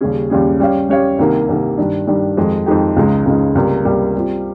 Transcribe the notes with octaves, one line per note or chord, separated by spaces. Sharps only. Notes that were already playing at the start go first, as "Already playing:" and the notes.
D#2 C#3 G3 C#4 G#4
D#2 C#3 G3 C#4 G#4
G3 C#4 G4 C#5 F5
G3 C#4 G4 C#5 F5
C2 C3 D#3 A#3
C2 C3 D#3 A#3
G2 D#3 G3
G2 D#3 G3
F2 D#3 G#3 D#4 G4
F2 D#3 G#3 D#4 G4
C#2 C#3 G#3 D#4
C#2 C#3 G#3 D#4
C#2 C3 G3 A#3
C#2 C3 G3 A#3
G3 C4 F4